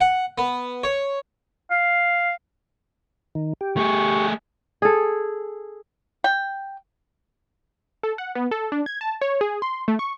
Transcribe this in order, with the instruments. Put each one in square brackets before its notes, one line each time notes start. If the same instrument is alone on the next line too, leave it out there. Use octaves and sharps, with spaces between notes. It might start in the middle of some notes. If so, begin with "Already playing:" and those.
[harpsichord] F#5
B3
C#5
[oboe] F5
[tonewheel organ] D#3
G4
[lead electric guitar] A3 G#4 [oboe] C#6
[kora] G#4 A4
[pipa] G5
[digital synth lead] A4
F#5
B3
A4
D4
G#6
A5
C#5
G#4
C6
A3
C#6